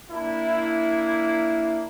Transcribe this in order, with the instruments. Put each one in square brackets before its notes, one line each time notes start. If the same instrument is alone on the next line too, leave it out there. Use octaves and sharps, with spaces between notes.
[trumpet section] A#3 D4 E4